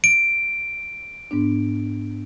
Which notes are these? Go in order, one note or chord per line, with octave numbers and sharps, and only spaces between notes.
D7
G#2 B3 D4